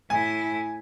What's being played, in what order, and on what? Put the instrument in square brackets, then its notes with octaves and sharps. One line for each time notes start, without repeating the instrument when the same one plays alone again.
[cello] A2 E4 [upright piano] G#5